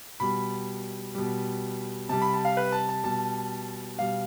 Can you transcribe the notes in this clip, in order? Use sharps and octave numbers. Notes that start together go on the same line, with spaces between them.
B2 G3 B5
B2 G3
C3 G3 A5
B5
A5
F5
B4
A5
A5
B2 G3 A5
B2 G3 F5